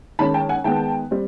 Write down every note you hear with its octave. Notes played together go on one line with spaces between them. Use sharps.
D#3 G#3 C#4 A5 B5
G5 A5
F#5 G#5
D#3 G#3 B3 G5 A5
G3 C4